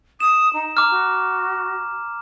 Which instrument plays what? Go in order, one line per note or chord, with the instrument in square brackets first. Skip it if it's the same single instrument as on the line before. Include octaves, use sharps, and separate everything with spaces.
[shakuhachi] D#6 [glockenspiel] E7
[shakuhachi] D#4
[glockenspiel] A#5 D6 F6
[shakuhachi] F#4